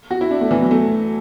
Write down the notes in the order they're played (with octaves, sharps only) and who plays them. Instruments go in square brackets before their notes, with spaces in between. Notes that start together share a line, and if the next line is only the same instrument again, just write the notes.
[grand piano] F#4
E4
D4
A3
E3
F#3
A3